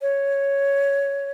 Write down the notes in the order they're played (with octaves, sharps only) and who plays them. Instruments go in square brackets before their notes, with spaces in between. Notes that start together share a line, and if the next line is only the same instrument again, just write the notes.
[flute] C#5